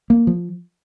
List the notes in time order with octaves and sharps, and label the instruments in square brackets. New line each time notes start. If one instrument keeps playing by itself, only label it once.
[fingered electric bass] A#3
F3